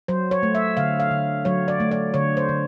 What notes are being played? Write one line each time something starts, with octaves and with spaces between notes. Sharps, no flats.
F#3 C5
C#5
A3
E5
D3 F5
F5
D3
F#3 C#5
D5
A3
D5
D3 C#5
C5
D3